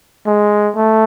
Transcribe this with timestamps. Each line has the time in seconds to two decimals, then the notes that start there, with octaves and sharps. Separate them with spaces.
0.26 G#3
0.76 A3